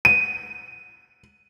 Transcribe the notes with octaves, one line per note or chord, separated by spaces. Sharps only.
D#7